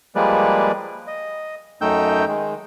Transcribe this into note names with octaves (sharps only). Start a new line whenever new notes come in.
F3 G3 G#3 A#3 B4 D5
D#5
F#2 A3 D#4 G5 E6 G6
D#3 G#3